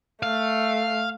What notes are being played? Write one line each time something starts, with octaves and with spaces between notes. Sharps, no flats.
A3 F5